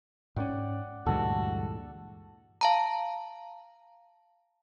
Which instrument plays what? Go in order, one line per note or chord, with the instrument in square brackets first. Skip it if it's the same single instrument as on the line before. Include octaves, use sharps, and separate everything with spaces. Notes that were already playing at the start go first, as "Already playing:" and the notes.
[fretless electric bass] G#2 C#4 [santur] D5 F#5 G5
[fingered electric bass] D2 G2 [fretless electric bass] A#2 E3 G#3 [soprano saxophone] F#4 [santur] A4
[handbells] F5 A5 A#5